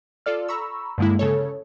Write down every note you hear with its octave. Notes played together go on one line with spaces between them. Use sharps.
F4 A4 D5 F6
A#5 B5 C#6 E6
G2 D3 G#3 A#3 E4
C#3 A4 C#5